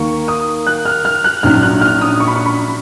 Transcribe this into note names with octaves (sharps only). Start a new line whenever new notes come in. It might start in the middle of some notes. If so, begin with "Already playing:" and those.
Already playing: D#2 D#3 A#3 C#6
D#6
F#6
F6
F6
F#6
A#1 G#2 F#3 C#4 F6
F#6
F6
D#6
C#6
B5
C#6
B5